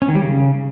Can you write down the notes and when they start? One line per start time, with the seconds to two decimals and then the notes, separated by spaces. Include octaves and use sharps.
0.02 C#4
0.08 D#3
0.15 G3
0.22 C#3